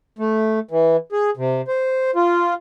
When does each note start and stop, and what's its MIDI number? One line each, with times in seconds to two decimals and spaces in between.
0.19 0.59 57
0.71 0.97 52
1.12 1.30 68
1.37 1.61 48
1.68 2.11 72
2.16 2.54 65